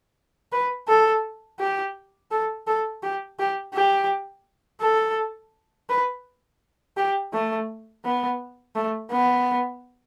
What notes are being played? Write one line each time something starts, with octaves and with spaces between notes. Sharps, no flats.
B4
A4
G4
A4
A4
G4
G4
G4
A4
B4
G4
A3
B3
A3
B3